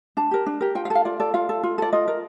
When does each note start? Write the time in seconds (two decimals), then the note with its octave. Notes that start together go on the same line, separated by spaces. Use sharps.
0.17 D4 A5
0.31 G4 A#4
0.46 D4
0.61 G4 A#4
0.75 F4 G5
0.85 F5
0.90 A4
0.95 F5
1.05 F4 D5
1.20 A4 D5
1.34 F4 F5
1.49 A4
1.63 F4
1.78 A4 D5
1.93 F4 D#5
2.08 A#4